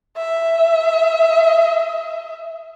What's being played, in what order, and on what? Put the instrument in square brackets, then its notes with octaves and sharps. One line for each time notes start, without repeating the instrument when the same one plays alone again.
[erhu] E5